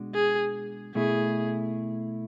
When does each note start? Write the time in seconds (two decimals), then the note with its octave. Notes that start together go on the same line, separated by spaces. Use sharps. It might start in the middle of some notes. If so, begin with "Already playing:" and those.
Already playing: B2 G#3 D4 F#4
0.14 G#4
0.95 B2 A3 E4 G#4